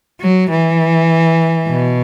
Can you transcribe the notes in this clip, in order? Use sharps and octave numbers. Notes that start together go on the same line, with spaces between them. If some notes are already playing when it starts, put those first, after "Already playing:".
F#3
E3
B2